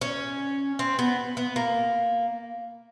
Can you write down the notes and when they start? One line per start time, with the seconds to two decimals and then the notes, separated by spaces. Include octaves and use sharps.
0.02 C#4
0.79 C4
0.99 B3
1.37 B3
1.56 A#3